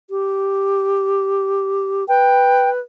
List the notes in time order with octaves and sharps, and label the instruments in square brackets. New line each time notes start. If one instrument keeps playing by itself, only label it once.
[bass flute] G4
[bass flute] B4 [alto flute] G5